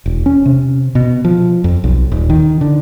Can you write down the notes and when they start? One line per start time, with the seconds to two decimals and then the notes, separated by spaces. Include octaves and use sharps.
0.06 E1
0.26 C#4
0.46 C3
0.95 B2
1.25 F3
1.64 F2
1.84 B1
2.12 D#1
2.30 D#3
2.61 D3